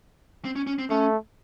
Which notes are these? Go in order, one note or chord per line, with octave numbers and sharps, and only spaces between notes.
C4
C#4
C#4
C4
A3 C#4